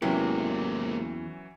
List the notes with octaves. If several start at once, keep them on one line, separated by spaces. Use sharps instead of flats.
E2 G#2 C3 E3 F#3 A#3 C#4